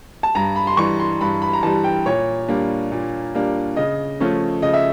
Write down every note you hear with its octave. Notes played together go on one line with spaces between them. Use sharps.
A5
G2 A#5
B5
C6
E3 G3 C#6
C6
G2 B5
B5
A#5
E3 G3 A5
G5
A#2 C#5
G3 A#3 D4
A#2
G3 A#3 D4
C#3 D#5
F3 A3 C#4
C#3 D#5
E5